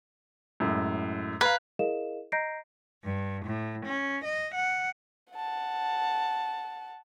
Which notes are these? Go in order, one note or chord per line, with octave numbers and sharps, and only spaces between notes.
F#2 A2 G#3
B4 F5 A#5 G#6
E4 G#4 A#4 D#5 F5 E7
D#5 A#5 G6 A#6 C7 D7
G2
A2
C#4
D#5
F#5
F#5 A5